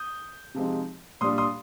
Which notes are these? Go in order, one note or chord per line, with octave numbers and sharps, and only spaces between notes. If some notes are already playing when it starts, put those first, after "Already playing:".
Already playing: D#6 G6
C3 F3 G#3 C4 D#4
A#2 G3 D4 C6 D#6
C6 D#6